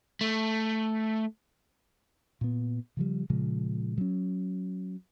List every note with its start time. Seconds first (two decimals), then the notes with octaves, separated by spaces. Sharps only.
0.21 A3
2.41 A#2 B3
2.97 C#3 F3 G3
3.30 A#2 C#3 F3 G#3
3.98 F#3 C#4